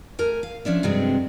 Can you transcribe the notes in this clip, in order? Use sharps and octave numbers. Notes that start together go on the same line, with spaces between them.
A3 A#4 G#5
F5
F3 C#4 D4 E5
G2 C3 F#3 G#3 C4